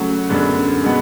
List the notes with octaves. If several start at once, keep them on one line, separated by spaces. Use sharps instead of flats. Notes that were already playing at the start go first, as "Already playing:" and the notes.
Already playing: C#3 F#3 A3 C#4 F#4
F#2 D3 G#3 B3 D4
B2 G#3 B3